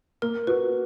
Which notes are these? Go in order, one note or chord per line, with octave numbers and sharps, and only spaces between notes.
A#3 A#4
F#4 B4